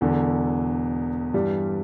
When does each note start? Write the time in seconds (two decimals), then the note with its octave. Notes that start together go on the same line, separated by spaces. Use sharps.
0.01 E1 E2 D3
1.34 G2 E3 G3